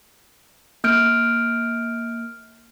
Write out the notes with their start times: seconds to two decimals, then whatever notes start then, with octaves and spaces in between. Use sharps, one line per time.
0.84 A#3 F6 G6 D7